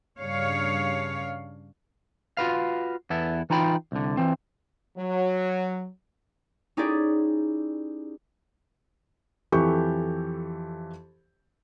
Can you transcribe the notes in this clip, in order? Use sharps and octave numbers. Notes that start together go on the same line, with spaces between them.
G2 C#3 G3 D4 C#5 F5
F4 F#4 B4 F5
E2 B3 E4 A4
E3 D#4 F4 G5 B5
C2 D3
E3 C4
F#3
C#4 D#4 E4 G4 G#4 D5
F2 E3 G4 A4 C#6 G6